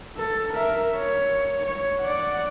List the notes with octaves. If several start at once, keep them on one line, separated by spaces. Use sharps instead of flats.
A4
A#4 E5
C#5
C#5
D5 F#5